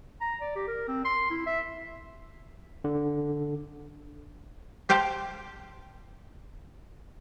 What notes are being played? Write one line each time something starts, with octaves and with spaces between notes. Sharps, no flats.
A#5
D5
G4
A#4
C4
C6
E4
E5
D3
G4 C5 F5 G5 A5